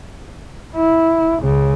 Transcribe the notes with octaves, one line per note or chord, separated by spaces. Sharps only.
E4
C#2 C#3